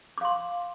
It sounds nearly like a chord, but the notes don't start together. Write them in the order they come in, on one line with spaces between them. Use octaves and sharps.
D6 F5 C6